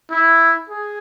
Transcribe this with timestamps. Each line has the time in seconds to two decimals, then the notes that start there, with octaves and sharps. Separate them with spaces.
0.10 E4
0.69 G#4